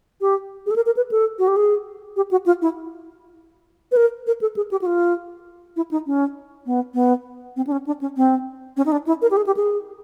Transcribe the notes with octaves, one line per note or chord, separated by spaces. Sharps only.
G4
G#4
A4
A#4
A#4
B4
A4
F#4
G4
G#4
G4
F#4
F4
E4
B4
A#4
A#4
A4
G#4
G4
F#4
F4
E4
D#4
C#4
B3
B3
C4
D4
C#4
D4
C#4
C4
C#4
D#4
D4
E4
A#4
G4
G#4
G4
G#4